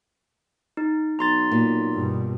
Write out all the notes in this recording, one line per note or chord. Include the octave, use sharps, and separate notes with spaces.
D#4
B1 A#5 C6 A6
A#2
G2 B2